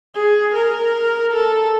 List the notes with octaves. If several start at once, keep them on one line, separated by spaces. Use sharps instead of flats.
G#4
A#4
A4